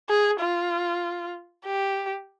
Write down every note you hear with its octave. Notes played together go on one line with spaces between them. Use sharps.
G#4
F4
G4